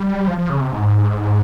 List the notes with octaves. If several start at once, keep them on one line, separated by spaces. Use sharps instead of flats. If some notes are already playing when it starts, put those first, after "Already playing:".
Already playing: G3
F3
F3
C#3
C3
G#2